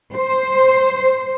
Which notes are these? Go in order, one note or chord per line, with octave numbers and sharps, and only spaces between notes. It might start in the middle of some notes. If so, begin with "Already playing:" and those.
C5